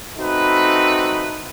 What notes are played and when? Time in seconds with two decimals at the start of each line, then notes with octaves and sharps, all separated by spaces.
0.18 A3 C4 D#4 F#4 B4